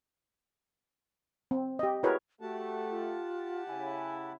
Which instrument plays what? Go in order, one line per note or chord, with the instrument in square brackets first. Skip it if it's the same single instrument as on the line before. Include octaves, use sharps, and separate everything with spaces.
[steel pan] C4
G4 D#5
E4 F#4 G#4 A#4 B4 C#5
[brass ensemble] A3 [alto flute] F#4 [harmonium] G4 F#5 A5
[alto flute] F4
[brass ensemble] C#3 E4 [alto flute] G#5